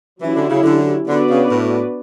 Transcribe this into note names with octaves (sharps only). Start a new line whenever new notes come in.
E3 F#3 C#4 E4 G4
D3
C#3
D3
D3 B3 D4 F#4 B4 D5
C#3
A2